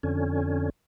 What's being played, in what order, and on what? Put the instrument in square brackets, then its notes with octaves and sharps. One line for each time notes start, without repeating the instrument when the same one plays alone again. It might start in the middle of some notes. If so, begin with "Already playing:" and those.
[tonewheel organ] F2 D3 C#4